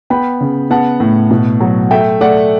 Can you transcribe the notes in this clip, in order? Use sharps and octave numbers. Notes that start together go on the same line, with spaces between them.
B3 G5 B5
C#3
B3 F#5 A5
A2
B2
F#3
A3 E5 G5
A3 D5 F#5